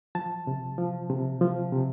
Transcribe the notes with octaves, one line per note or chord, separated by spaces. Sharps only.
F3 A5
C3
F3
C3
F3
C3